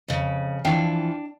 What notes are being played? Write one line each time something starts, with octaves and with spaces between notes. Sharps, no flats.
F2 C#3
E3 F3 D4 F5 G5